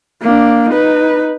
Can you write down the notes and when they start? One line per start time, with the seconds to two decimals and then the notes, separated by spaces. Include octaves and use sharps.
0.22 A#3 D4
0.70 D#4 B4